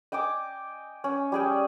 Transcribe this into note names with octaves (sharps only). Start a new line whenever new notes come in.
D#5 G5 G#5 D6
C#4
G3 G#4 G5